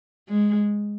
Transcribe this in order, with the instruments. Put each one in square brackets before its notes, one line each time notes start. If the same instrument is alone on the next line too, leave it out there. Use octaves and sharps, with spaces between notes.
[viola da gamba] G#3